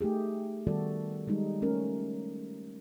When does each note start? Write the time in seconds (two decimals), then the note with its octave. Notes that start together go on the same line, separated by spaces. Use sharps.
0.01 A3 D#4 G4 G#4
0.67 D#3 G3 B3 F#4 A4 D5
1.28 G3 G#3 D#4
1.62 A3 C#4 A#4